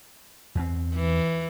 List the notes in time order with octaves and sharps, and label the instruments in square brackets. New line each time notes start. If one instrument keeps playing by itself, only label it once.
[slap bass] E2 C4
[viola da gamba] E3